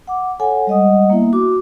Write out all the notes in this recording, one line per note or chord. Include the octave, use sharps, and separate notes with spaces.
F#5 D6
A4 C#5 F#5 G#5
G3 G#3 D#5 F#5 D#6
A#3 B3 E4 E5
F#4 D6